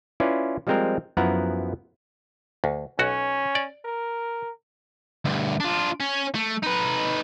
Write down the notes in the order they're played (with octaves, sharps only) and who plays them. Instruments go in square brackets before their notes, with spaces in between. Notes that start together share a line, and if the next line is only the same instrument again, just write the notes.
[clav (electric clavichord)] C#4 E4 F4 B4 D5
F3 G3 G#3 C4 A#4
F#2 F3 B3 E4 F#5 A#5
D2
[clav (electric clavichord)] B1 F#4 [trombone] C#4
[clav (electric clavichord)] D5
[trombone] A#4
[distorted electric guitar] D2 G2
D4 F4
C#4
A3
D#4 B4